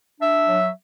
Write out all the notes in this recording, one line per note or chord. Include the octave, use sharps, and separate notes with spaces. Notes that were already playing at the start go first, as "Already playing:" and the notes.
D4 E5
F#3